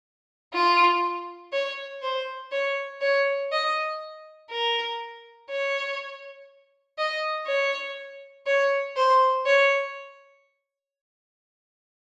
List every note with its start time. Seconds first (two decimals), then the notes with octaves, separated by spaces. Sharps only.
0.54 F4
1.53 C#5
2.03 C5
2.52 C#5
3.01 C#5
3.52 D#5
4.51 A#4
5.50 C#5
6.98 D#5
7.47 C#5
8.46 C#5
8.97 C5
9.46 C#5